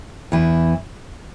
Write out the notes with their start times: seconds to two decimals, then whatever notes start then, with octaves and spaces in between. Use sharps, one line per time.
0.32 E2 E3